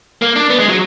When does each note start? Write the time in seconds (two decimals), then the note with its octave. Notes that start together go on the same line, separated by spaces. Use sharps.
0.22 A#3
0.36 D4
0.50 B3
0.59 G#3
0.69 F#3